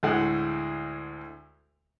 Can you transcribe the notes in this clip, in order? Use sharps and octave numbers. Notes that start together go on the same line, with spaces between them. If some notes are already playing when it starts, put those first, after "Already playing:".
D2 A2 G#3 F#5